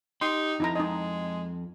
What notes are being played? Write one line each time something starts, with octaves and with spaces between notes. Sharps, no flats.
D#4 G4 C6
F2 D#4 E4 A#5
G#3 D#4 D#5